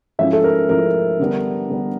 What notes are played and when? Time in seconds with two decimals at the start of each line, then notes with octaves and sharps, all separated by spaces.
0.19 G#2 F3 A3 C#4 E4 E5
0.33 A4
0.44 A#4
0.69 G#2 F3 A3 C#4 E4 A#4
1.20 D3 G3 B3 D4
1.70 D3 G3 B3 D4